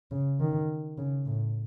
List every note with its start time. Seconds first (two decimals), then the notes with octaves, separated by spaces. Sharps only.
0.11 C#3
0.40 D#3
0.98 C#3
1.26 A2